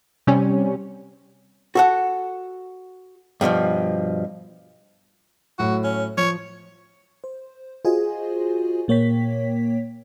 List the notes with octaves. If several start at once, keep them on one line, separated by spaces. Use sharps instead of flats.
C3 G3 C#4
F#4 A4 F#5
G2 B2 D3 F3
A2 F#3 F#4
C#4
F3 C#5
C5
F4 F#4 G#4 C5 D#5 G#5
A#2 A#3 C#5 G5 B6